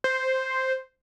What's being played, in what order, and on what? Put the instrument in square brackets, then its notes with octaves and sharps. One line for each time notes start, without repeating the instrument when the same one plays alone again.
[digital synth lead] C5